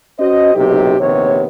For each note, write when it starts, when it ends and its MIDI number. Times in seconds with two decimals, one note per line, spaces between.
0.20 0.54 61
0.20 0.54 66
0.20 0.54 72
0.20 0.54 75
0.55 0.95 30
0.55 0.95 35
0.55 0.95 48
0.55 0.95 63
0.55 0.95 67
1.00 1.47 34
1.00 1.47 39
1.00 1.47 48
1.00 1.47 59
1.00 1.47 73